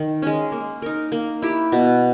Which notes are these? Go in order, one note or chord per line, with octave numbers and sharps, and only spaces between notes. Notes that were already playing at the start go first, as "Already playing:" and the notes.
Already playing: D#3
G#3 C#4
A#3
D#4 A#4
A#3
E4 G4
B2